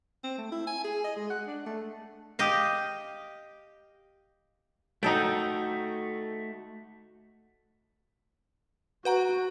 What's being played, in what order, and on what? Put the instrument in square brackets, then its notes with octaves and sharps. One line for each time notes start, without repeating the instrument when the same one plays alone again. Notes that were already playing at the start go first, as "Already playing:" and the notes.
[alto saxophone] C4
A3
E4
G#5
G#4
D#5
G#3
F#5
D4
A3
[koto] G4 D#5 F5
[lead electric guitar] A3 F#4 [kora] D#4 A4 G5
[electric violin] F#4 [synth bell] B4 F#5 A#5